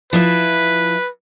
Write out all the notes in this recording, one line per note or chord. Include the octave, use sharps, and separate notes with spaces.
F3 E4 B4 E5